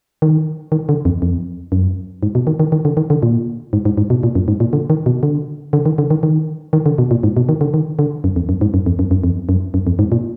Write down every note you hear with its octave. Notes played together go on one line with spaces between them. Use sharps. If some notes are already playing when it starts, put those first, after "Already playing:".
D#3
D#3
D3
F2
F2
F#2
G#2
B2
D#3
D#3
D#3
D3
D#3
D3
A#2
G#2
G#2
G#2
B2
A#2
F#2
G#2
A#2
D3
D#3
B2
D3
D3
D#3
D3
D#3
D#3
D#3
D3
B2
A#2
G#2
B2
D#3
D3
D#3
D3
F#2
F2
F#2
G#2
F#2
F2
F#2
F#2
F2
F#2
F#2
F2
G#2
A#2